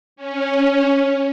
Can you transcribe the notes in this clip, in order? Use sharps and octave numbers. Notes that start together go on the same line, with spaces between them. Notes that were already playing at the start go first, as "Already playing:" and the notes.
C#4